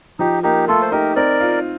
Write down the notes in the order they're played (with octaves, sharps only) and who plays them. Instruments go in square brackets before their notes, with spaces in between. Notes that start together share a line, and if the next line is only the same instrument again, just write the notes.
[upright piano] F3 [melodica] D#4 G4
[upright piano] A#3 [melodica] D#4 G4
[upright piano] A3 [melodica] F4 A4
[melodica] C5
[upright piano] D#4 [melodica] G4 A#4
[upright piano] C4 [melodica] A#4 D5
[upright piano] F4